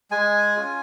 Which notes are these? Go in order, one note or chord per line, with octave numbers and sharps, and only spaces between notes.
G#3 G#5
C#4 F4